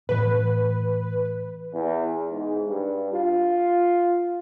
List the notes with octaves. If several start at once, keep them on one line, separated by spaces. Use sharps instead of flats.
A2 E3 B4
E2
G#2
G2
F4